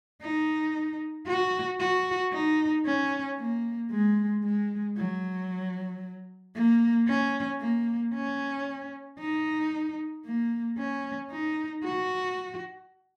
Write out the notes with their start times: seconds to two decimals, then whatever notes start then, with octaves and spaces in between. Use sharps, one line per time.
0.22 D#4
1.27 F#4
1.80 F#4
2.32 D#4
2.86 C#4
3.39 A#3
3.92 G#3
4.44 G#3
4.97 F#3
6.55 A#3
7.07 C#4
7.60 A#3
8.14 C#4
9.19 D#4
10.25 A#3
10.78 C#4
11.31 D#4
11.83 F#4